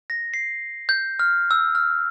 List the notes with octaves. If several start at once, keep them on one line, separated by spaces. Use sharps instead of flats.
A#6
C7
G6
F6
E6
F6